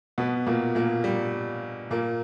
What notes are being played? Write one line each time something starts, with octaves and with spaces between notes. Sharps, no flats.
B2 B3
A#2 A#3
A#2 A#3
G3
A#2 A#3